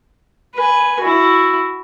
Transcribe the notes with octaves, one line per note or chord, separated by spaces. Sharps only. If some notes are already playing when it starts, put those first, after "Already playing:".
B4 G#5
E4 F#4